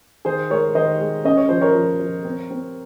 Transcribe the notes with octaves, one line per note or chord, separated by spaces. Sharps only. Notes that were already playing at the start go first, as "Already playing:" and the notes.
D#3 G#4 C5
G#3 A#4 C#5
D#3 C5 D#5
G#3
C#4 D#5
C#5
F3 C5
A#4 C#5
F3
F3
C4
C4